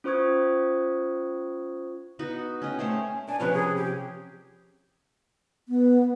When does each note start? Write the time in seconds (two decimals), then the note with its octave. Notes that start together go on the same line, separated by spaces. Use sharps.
0.04 C#4 F4 C5 C#6 D#6 G#6
2.19 B3 D#4 F#4
2.62 C#4 D#5 G5
2.79 A3 C#4 C5 C#5
3.29 D4 G#5
3.40 C3 F3 C#4 B4
3.54 G#4
3.77 G4
5.69 B3